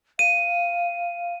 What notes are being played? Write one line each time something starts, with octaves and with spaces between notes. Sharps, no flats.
F5 D#7